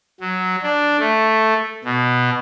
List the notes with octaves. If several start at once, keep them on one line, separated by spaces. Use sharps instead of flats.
F#3
D4
A3
B2